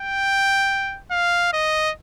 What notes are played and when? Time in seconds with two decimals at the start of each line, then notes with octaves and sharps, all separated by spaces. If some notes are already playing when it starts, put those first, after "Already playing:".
Already playing: G5
1.11 F5
1.53 D#5